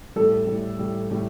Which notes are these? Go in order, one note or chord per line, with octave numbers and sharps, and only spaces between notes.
A2 G3 A4
A2 G3
A2 G3
A2 G3